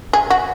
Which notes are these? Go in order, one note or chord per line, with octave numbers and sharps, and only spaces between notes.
G#4
F#4